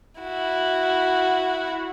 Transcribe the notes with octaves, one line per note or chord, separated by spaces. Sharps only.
E4 F#4